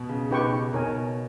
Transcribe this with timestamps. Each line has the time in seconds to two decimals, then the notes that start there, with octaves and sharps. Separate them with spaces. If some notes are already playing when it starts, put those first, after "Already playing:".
Already playing: B2
0.09 C#3
0.30 B2 D#4 G4 B4 G5 C#6
0.73 B2 D#4 A#4 C#5 G#5